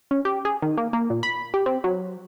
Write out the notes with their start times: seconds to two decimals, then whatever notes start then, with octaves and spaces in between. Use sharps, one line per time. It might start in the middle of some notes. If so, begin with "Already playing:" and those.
0.11 C#4
0.25 G4
0.45 G#4
0.62 D#3
0.77 A#3
0.93 A#3
1.10 A#2
1.23 B5
1.54 G4
1.66 C4
1.84 F#3